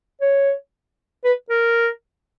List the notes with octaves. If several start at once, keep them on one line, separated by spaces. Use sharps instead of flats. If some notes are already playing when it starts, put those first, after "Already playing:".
C#5
B4
A#4